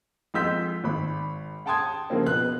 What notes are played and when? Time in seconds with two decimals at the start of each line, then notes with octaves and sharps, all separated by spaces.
0.34 F2 G#3 F4 E6 G6 B6
0.84 G#1 B5
1.66 F#5 G5 A5 C6 D#6 G#6
2.10 C#3 F3 A#3 C4
2.26 B2 B3 F#6